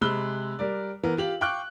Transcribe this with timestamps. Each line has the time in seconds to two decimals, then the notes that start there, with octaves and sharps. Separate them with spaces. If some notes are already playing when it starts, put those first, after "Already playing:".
0.01 C3 G#3 B5 E6 F#6 G7
0.59 G3 A#4 D5
1.03 E3 B3 A#4
1.17 F4 G4 F#7
1.41 F5 G5 C#6 D6 F#6